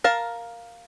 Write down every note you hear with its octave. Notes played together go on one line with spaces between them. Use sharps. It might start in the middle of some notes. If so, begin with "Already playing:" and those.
A#4 F5 A5